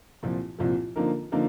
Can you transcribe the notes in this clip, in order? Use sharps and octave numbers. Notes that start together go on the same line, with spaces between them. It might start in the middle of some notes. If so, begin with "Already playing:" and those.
C2 A#2 F3
C2 A#2 F3
D3 F3 A#3 D#4 A#4
D3 F3 A#3 D#4 A#4